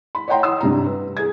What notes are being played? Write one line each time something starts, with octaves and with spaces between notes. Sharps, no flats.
B5
C#5 D#5 F#5 G5 A#5 C6
C6 D#6 E6
G2 C3 A#5
B4
G#4 G#6